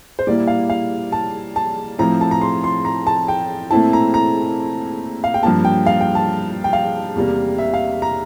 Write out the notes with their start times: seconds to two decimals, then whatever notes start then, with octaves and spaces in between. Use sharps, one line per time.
0.19 C5
0.27 A#2 G3 A#3 E4 D5
0.47 F5
0.70 F5
1.12 A5
1.56 A5
1.98 A2 F3 C4 E4 A#5
2.21 A5
2.31 A#5
2.41 C6
2.64 C6
2.85 A#5
3.07 A5
3.28 G5
3.71 A#2 A3 C4 E4 A5
3.93 A#5
4.14 A#5
5.24 F5
5.34 G5
5.43 G2 F3 A#3 A5
5.65 G5
5.86 F5
6.01 G5
6.15 A5
6.64 G5
6.73 F5
7.15 E2 C3 G3 A#3
7.58 E5
7.74 F5
8.02 A#5